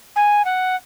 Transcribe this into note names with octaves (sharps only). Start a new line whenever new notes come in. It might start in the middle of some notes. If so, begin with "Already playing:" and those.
G#5
F#5